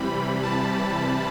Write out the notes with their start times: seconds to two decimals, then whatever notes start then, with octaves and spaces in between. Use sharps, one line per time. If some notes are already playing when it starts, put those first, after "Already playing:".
Already playing: C3 E3 G3 B5
0.43 A5